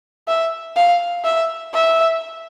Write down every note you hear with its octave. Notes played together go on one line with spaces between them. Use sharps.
E5
F5
E5
E5